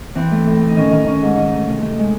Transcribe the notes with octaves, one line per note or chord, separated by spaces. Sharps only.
E3 C4
A3
A2
A2
D#4
D#3 C#4
D#3 D#4
D#3 C#4
G#2
D#3
A3
C3
A3
G#3